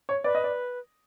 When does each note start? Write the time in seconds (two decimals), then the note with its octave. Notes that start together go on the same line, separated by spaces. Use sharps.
0.09 C#5
0.24 B4 D5
0.35 D#5
0.44 D5